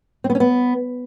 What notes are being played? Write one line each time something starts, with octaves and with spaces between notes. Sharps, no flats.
C4
B3
C#4
B3